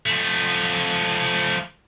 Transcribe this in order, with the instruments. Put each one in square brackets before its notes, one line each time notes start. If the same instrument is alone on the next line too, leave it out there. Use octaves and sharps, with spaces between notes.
[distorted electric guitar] F3 A3